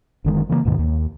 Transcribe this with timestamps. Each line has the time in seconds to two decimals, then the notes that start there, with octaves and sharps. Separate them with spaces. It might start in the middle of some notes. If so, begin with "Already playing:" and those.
0.24 F#1 D3 D#3 G#3
0.49 C#3 E3 F#3 A#3
0.65 D2 G#2 B2 D#3
0.79 D#2